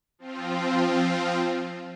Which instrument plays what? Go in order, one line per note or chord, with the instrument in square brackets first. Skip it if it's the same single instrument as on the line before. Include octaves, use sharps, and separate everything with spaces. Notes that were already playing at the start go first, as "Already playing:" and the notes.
[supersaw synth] F3 C4 F4